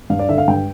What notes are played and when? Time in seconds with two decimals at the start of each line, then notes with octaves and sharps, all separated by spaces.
0.10 G2 F5
0.19 D5
0.29 D3 E5
0.38 F5
0.48 G2 G5